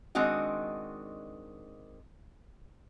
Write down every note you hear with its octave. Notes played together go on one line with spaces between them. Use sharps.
D#3 G#3 C4 D4 F#4 D#5